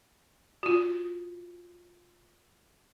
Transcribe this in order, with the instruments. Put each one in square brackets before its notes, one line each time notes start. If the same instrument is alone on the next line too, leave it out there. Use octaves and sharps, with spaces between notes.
[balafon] F4 F#4